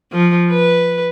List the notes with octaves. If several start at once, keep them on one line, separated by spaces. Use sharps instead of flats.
F3
B4